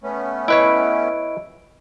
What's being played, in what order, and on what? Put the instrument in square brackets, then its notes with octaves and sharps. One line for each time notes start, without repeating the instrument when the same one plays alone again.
[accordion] A3 B3 C#4
[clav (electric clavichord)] E4 B4 C#5 [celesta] D#5 D7